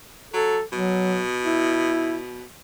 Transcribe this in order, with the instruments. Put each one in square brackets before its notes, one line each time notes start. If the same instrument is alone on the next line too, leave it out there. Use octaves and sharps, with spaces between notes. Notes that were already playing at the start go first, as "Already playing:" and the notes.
[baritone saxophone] F#3 [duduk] A4
[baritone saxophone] B2 [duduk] F#3
[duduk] E4